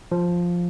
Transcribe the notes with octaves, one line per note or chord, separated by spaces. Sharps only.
F3